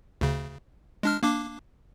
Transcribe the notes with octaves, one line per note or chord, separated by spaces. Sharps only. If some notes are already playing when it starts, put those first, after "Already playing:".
D2 C#3
G#3 D4 F6
A#3 D4 D6